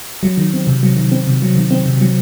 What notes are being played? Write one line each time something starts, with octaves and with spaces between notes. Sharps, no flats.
F#3
D#3
C4
C3
F#3
D#3
C4
C3
F#3
D#3
C4
C3
F#3